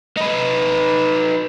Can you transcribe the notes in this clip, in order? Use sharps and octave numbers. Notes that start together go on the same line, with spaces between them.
D#4 B4